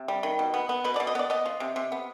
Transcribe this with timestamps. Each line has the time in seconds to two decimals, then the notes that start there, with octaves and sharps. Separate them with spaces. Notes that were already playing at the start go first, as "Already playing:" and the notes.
Already playing: C3
0.08 G3
0.23 D#3
0.39 B2
0.54 B3
0.69 B3
0.84 B2 B4
0.96 D5
1.00 B2
1.07 D#5
1.15 B3 D5
1.30 B3 D#5
1.46 F3
1.60 C3
1.76 C3
1.92 B3